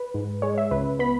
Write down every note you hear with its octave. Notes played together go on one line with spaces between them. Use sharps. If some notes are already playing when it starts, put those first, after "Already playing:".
Already playing: B4
G#2
G#3 C#5
E5
C#2 B4
B3 B5